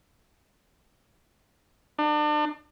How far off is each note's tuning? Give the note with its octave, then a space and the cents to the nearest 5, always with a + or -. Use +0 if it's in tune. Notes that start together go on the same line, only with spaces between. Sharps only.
D4 +35